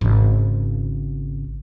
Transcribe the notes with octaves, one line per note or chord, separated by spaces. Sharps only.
G#1 C#3